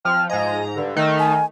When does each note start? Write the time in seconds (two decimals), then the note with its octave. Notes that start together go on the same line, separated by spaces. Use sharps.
0.05 F3 C4 F6
0.30 G#2 F3 D#5 G#5 A#5
0.76 G2 D3
0.96 D#3 A3 D#4
1.19 G#5